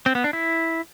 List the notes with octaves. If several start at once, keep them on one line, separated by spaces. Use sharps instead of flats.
C4
B3
D4
E4